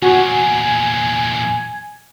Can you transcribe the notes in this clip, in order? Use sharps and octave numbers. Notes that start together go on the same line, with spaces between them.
E2 A#2 F#4 G#5